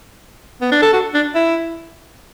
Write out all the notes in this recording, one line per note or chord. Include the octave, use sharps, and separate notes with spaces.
B3
D4
A4
F#4
D4
E4